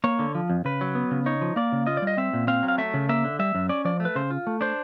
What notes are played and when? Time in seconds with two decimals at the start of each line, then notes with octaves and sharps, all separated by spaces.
0.04 A#3 C#5
0.19 D3
0.35 F3
0.50 F2
0.65 C#3 B4
0.81 F#3
0.95 B3
1.11 C#3
1.26 D#4 C#5
1.41 F3
1.56 A#3 D5
1.72 C#3
1.86 F4 D#5
1.97 D5
2.02 G3
2.07 D#5
2.17 C4 E5
2.33 A#2
2.47 C4 F5
2.63 F#3
2.68 F5
2.78 A3 E5
2.94 C#3
3.09 A#3 E5
3.24 D3
3.39 G3 E5
3.55 F#2
3.69 C#4 D5
3.85 F3 D5
4.00 A3
4.05 B4
4.15 C#3 C5
4.31 F4
4.47 A3
4.61 D4 C5